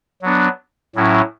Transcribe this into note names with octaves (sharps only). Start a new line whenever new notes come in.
F#3 B3 D4
A2 F#3 C#4 E4